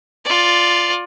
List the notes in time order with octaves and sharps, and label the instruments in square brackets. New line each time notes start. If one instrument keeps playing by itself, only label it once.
[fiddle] F4 D5